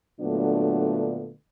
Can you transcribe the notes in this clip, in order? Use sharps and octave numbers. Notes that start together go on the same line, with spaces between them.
A#2 D3 F#3 A3 B3 D4